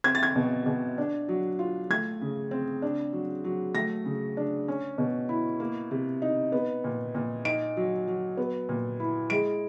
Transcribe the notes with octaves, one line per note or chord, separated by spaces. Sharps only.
C4 G#6
A6
G#6
B2
B2
D4
F#3
F4
A3 G#6
C#3
C4
D4
F#3
F#3
A3 A#6
C#3
D4
C#4
B2
E4
A#3
C3
D#4
B3
A#2
A#2
D#4 D7
F#3
F#3
B3
A#2
E4
G#3 D7